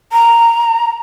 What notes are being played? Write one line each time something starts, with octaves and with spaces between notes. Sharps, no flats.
A#5